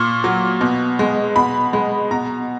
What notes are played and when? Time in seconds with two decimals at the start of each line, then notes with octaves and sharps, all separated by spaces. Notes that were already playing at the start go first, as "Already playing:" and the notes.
Already playing: A#2 C#6
0.24 F#3
0.61 B2
0.99 G#3
1.36 B2 B5
1.73 G#3
2.11 B2 A#5